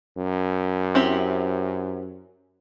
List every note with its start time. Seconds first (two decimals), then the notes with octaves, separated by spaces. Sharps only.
0.17 F#2
0.95 C4 E4 G4